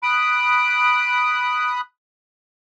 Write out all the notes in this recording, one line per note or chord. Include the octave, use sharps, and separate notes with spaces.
B5 D#6 F#6 D7